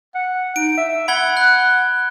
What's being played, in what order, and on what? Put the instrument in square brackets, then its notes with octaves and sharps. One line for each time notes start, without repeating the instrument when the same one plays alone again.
[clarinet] F#5
[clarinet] D#4 [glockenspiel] D7
[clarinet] E5
[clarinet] F#5 [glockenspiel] B5 G#6 G7
[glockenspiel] F#6